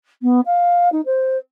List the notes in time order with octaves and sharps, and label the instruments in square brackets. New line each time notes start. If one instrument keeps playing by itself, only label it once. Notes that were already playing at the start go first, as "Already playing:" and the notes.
[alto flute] B3
F5
D#4
C5